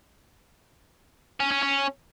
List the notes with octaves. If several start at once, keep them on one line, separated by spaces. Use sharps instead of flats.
C#4
C#4
C#4